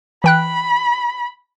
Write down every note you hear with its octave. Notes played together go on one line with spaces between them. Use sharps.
E3 G5 B5 F#6